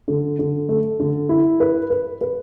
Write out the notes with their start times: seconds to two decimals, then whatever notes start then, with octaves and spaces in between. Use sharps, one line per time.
0.08 D3
0.39 D3
0.69 A3
1.00 D3
1.29 E4
1.60 B4
1.90 B4
2.21 B4